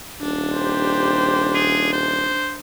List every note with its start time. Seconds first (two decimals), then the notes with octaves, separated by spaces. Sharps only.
0.21 D#1 D4
0.53 G4 C5
1.55 G#4
1.93 C5